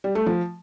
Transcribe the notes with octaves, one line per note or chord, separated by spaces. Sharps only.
G3
A3
F3